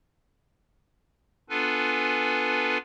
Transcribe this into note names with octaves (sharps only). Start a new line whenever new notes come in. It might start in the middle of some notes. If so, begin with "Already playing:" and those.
B3 D4 F4 A4 B4 G#5